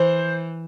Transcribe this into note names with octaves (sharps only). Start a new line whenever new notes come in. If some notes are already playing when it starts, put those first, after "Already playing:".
Already playing: E3 C5